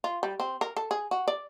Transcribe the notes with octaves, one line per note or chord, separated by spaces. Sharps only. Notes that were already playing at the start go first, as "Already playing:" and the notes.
F4
G3
C4
A#4
A4
G#4
F#4
D5